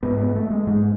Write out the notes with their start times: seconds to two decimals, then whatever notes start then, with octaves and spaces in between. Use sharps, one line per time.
0.03 G#2 B3
0.18 B3
0.35 A3
0.50 G#3
0.67 G#2 G#3